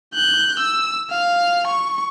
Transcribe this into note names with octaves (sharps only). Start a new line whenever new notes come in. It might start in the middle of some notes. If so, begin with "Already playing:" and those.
F#6 G6
E6
F5
C#6